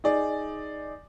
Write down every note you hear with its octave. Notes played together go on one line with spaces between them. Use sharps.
D#4 G#4 D5